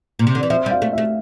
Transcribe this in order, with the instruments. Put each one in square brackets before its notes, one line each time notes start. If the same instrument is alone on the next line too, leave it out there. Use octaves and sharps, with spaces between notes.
[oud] A#2
C3
D3
E3
[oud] F3 [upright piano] E5
[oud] G3
[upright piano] F5
[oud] A3
[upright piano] E5
[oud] A3